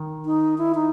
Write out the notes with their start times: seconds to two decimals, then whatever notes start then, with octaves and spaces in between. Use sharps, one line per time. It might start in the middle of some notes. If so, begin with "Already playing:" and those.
Already playing: D#3
0.25 D#4
0.58 E4
0.75 D#4